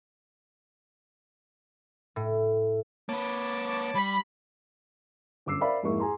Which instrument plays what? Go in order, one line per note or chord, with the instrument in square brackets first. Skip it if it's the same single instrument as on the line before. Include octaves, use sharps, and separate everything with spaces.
[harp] A2
[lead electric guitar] A#3 B4 [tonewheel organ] C#5 A5 D6
[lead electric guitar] G3 [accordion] B5
[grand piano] G1 F#2 D6 E6 C7
A#4 C5 D5 E5 F5 B5
F2 G#2 G#3 A#3 E4 C#6
G#4 G#5 A#5 C6